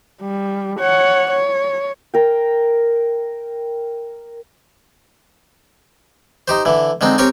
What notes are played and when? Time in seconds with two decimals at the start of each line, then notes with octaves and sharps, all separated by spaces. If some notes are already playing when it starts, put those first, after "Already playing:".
0.22 G3
0.80 C#5 F#5
1.31 C#5
2.14 A#4 G5
6.48 D#4 G4 C5
6.65 D3 E3
7.01 D3 G#3 C4 D#4
7.18 C4 G4 A#4 C#5 G#5